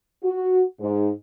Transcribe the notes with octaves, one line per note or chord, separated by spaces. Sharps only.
F#4
G#2